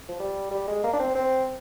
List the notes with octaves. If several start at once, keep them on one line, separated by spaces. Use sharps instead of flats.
F3
G3
G3
G#3
A#3
D4
C4
C4